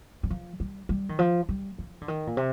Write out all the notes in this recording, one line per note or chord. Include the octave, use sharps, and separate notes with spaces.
G3
F3
G3
G3
D#3
F3
G3
F3
D3
D#3
A#2
C3